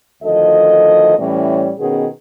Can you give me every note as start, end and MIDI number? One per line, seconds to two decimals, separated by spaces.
0.23 1.15 38
0.23 1.15 51
0.23 1.15 53
0.23 1.15 69
0.23 1.15 75
1.19 1.71 45
1.19 1.71 52
1.19 1.71 55
1.19 1.71 61
1.19 1.71 73
1.19 1.71 74
1.78 2.06 47
1.78 2.06 51
1.78 2.06 59
1.78 2.06 61
1.78 2.06 68